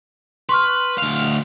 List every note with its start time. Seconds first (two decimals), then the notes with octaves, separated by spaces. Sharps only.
0.49 B4 C6 C#6 F6
0.98 D2 F5